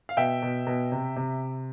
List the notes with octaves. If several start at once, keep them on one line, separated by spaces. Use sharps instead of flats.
F5
B2 E5 G5
B2
B2
C3
C3